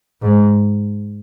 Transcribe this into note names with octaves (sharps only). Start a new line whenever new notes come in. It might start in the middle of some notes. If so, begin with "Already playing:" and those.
G#2